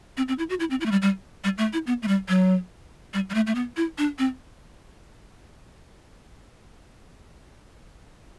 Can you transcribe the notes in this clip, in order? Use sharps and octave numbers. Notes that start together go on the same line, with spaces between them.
C4
C4
E4
F#4
E4
C4
E4
A3
G3
G3
G3
A3
E4
B3
A3
G3
F#3
G3
G3
A3
A3
B3
E4
D4
C4